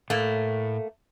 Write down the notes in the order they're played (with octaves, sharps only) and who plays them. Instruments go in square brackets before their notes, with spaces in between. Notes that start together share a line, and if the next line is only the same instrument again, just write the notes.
[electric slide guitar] A2 [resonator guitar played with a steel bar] A3 A#3